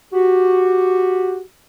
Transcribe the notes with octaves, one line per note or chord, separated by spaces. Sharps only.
F#4 G4